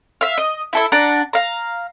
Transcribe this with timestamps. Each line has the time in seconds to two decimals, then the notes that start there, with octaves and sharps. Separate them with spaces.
0.21 E5 F5
0.38 D#5
0.73 E4 A4 E5
0.92 D4 F#5 A#5
1.33 F5 A#5